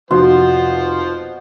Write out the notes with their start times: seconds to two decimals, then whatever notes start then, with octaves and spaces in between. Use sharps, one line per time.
0.11 F1 B2 F3 F#4 C5 C6